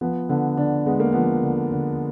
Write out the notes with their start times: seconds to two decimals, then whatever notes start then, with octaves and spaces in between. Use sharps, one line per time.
0.01 F3 B3
0.29 D3 B3
0.57 D3 D4
0.86 G#3 B3
1.00 A#3
1.13 F3 B3
1.43 D3
1.72 D3